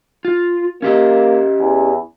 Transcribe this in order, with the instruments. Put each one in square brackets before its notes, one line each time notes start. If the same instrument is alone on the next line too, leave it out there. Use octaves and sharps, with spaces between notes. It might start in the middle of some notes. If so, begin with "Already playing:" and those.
[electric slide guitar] F4
[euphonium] A#3 [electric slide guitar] C#4 G4 D#5
[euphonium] E2